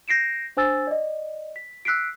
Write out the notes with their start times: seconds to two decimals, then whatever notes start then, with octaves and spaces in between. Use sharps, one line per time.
0.08 G6 A#6 C7 D7 E7
0.57 D4 C5 G#5 E6 A6
0.87 D5 D#5
1.56 B6
1.85 E6 F#6 B6 C7 D7